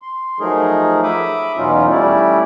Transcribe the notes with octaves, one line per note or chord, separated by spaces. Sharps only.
C6
F3 F#3 A3 D#4 G#4 A#4
E5 B5 D6 D#6
E2 B2 F#3 C#4 D#4 F4
G3 A3 C#4 E4 D5